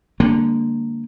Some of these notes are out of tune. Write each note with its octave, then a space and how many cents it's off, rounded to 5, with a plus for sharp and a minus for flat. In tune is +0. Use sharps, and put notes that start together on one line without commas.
D3 +0 G3 +40 A#3 -10